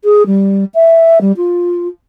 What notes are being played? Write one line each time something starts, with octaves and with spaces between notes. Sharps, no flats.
G#4
G3
E5
G3
F4